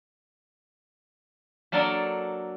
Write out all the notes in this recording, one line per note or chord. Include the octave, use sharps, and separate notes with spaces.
F#3 A#3 D4 A4 A#4 D5